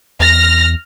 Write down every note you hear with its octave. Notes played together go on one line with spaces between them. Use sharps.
E2 F6 A#6